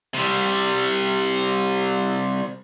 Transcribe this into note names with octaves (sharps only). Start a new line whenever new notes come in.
C3 G3